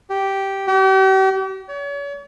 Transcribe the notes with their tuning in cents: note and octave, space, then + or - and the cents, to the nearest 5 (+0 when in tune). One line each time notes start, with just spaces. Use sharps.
G4 -10
G4 -40
C#5 +40